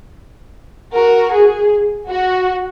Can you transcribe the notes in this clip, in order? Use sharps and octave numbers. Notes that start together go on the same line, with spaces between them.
F#4 A#4
G#4
F#4